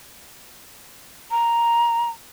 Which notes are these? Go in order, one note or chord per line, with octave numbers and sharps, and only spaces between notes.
A#5